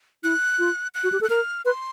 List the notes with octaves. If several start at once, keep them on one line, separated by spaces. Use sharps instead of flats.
E4 F#6
F4
F#6
F#4
G4
A4
F#6
A#4 F6
B4 C6